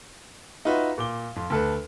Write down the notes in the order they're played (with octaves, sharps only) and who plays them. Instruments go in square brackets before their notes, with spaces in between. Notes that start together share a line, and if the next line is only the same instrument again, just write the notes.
[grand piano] D#4 F4 F#4 B4 E5
A#2 D6 G7
F2
D2 A4 B4